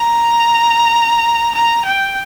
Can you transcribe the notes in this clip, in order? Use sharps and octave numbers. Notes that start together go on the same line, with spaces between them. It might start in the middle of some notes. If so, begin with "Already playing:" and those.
Already playing: A#5
A#5
G5